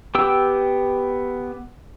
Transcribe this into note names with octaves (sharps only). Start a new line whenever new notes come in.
B3 G4 G5 E6